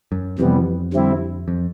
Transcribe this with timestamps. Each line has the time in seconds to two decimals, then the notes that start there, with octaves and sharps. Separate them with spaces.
0.12 F#2
0.39 F2 C3 E3 G3 B3
0.93 D3 G3 C4 E4
1.48 F2